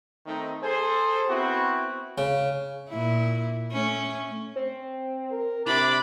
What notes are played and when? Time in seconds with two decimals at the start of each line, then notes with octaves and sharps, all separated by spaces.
0.25 D#3 A3 C4 D#4
0.62 G#4 A4 C5
1.28 B3 C4 E4 F#4
2.18 C#3
2.90 A#2 E4
3.72 A3 C#4
4.56 C4
5.31 A#4
5.67 C3 D4 E4 B5 D6